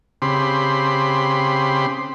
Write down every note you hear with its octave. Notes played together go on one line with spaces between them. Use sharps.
C#3 C4 G4 B5 C6